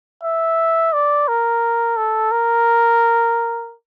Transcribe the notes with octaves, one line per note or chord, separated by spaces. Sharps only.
E5
D5
A#4
A4
A#4